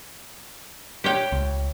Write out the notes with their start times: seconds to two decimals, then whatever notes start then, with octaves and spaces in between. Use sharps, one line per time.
1.04 G4 C#5 G5
1.32 C#2